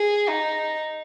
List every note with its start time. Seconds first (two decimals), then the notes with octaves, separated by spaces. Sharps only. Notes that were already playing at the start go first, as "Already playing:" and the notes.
Already playing: G#4
0.30 D#4